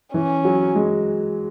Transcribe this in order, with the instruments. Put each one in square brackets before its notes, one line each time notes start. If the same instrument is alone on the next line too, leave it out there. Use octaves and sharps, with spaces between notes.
[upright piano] E3 [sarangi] C#4
[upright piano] F#3
G#3